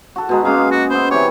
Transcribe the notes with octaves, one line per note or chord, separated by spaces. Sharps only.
F#4 A4
B2 G#3 F#4 A#5
G#3 A#3 C#4 D#5 F5
F#4
B3 C5 E5
C3 E3 G4 C#5